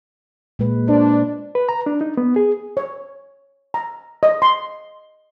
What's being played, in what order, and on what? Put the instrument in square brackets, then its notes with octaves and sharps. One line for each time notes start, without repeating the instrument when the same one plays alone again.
[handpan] A#2 G#3 B4
[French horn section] D4 [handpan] C5
[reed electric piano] B4
A#5
D4
D#4
B3
G#4
[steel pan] C#5
A#5
D#5
C6